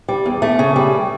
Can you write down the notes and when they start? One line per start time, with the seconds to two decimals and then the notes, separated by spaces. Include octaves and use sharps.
0.09 G3
0.26 E2
0.42 A3
0.59 C#3
0.76 G3